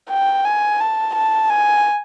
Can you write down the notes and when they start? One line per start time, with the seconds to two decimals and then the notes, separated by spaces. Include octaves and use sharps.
0.10 G5
0.45 G#5
0.80 A5
1.15 A5
1.50 G#5